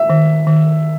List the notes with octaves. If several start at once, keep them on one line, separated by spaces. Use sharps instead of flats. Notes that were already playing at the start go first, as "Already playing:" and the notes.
Already playing: E5
D#3
D#3